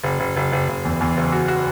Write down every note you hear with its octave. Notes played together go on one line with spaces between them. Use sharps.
F#1
F#1
F#1
F#1
F#1
E2
E2
F#1
F#4
F#4